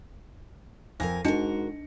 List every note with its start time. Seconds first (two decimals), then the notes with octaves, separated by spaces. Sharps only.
1.00 F2 A#4 F5 G#5 A#6
1.25 G#2 D4 D#4 F#4 A#4 D#5 C#7